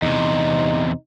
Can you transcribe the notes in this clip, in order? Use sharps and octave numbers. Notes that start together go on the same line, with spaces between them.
E2 C3 D#4